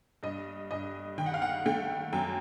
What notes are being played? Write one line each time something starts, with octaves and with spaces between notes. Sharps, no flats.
G2 D#5
G2 D#5
D#3 G5
F#5
F5
F#5
A3 G5
F#2 G5